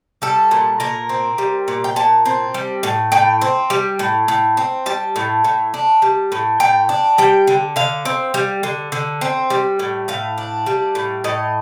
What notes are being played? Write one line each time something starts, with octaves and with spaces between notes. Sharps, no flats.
G3 A4
A#2
A#2 A#4
C4
G3
A#2
G5
A#2 A5
C4
G3
A2
A2 G5
C4
G3
A2
A2
C4
G3 A5
A2
A2
D4
G3
A2
A2 G5
D4
G3 G5
D3
D3 F5
C4
G3
D3
D3
C4
G3
A2
A2 F5
D4
G3
A2
A2 D#5